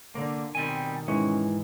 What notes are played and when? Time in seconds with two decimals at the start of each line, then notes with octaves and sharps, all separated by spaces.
0.15 D3 A#3
0.55 B2 D#3 G3 C4 G#5
1.08 G#2 E3 G#3 C#4